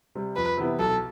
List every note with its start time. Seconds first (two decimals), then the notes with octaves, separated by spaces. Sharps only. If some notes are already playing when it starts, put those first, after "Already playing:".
0.15 C3 G3
0.36 F2 B4
0.57 C3 E3 B3 E4
0.79 B1 A4